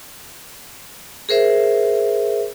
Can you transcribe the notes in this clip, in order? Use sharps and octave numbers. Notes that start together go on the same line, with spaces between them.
G#4 A#4 C5 E5